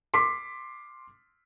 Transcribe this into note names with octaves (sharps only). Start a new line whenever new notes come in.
C6 D6 B6